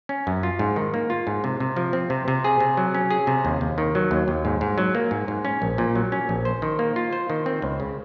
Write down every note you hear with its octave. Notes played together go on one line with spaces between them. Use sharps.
C#4
F#2
F4
G#2
D#3
A#3
F4
G#2
C3
C3
F3
C4
C3
C3
G#4
C3
F#3
C#4
G#4
C3
D#2
D#2
D#3
F#3
D#2
D#2
G#2
G#2
F#3
A#3
G#2
G#2
C#4
A#1
A#2
F#3
C#4
A#1
C5
D#3
A#3
F4
C5
D#3
C4
C#2
C#3